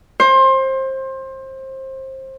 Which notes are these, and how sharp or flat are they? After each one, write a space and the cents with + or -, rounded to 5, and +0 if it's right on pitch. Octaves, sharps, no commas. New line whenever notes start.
C5 +25